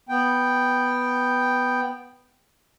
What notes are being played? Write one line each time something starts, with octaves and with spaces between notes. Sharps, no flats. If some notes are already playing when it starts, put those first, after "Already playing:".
B3 G5